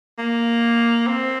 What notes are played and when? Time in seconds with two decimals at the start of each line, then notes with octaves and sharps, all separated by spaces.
0.18 A#3
1.07 C4